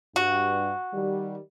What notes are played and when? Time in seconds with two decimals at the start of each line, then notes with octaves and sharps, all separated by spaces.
0.16 G2 F#4
0.94 D#3 G3